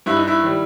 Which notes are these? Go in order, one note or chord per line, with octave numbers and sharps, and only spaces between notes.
G2 E4
D#4
E4
D#3 G3